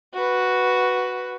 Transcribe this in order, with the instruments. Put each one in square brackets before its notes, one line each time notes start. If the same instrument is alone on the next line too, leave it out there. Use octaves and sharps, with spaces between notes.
[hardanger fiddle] F#4 B4